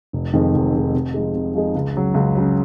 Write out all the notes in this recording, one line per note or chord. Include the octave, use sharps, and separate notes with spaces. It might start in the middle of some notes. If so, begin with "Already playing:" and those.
F1
F2 D#3 G#3 C4
F1
F2 D#3 G#3 C4
C3
F3 G#3 D#4 G#4
C3
F3 G#3 D#4 G#4
C#2
C#3 F#3
C#2
C#3 F#3